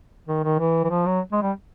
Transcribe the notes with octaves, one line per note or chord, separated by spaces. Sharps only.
D#3
D#3
E3
E3
F3
F#3
G#3
G3